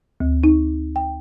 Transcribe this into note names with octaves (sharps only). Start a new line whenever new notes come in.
D2
D#4
G5